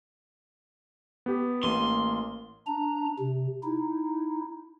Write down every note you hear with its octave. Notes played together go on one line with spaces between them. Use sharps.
B3 G4
A1 A#3 C6 D#7
D4 A#5
C3
D#4 E4